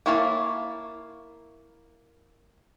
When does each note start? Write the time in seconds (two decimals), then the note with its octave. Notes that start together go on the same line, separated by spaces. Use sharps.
0.06 A#3 E4 C#5 F5 A5